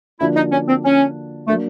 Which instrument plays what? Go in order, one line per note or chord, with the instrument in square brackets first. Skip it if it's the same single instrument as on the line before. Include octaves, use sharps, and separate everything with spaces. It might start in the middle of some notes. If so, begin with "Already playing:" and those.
[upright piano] D3 F3 A#3 D4 F#4 [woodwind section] E4
[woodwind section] D#4
C#4
C4
C#4
[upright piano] F#3 A#3 D4 [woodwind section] A3